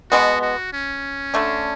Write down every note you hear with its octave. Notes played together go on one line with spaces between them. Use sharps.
B2 G#3 B3 F#4
F#4
C#4
D3 A3 D4